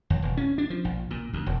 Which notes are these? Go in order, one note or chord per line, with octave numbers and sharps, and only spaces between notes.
D#2
E1
C#4
D4
F3
A#1
A#2
D2
E1